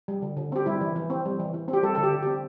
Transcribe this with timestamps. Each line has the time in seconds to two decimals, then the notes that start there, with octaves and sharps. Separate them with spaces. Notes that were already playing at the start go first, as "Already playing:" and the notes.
0.08 G3
0.22 D3
0.37 D3
0.52 C4 G4
0.66 G3 E4
0.81 E3
0.96 E3
1.10 C4
1.25 G3
1.40 E3
1.54 E3
1.68 C4
1.73 G4
1.83 G3 A4
1.95 D3 A4
2.03 G4
2.12 D3
2.23 C4 G4